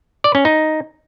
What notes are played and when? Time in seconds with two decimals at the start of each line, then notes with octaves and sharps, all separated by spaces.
0.24 D5
0.35 C#4
0.45 D#4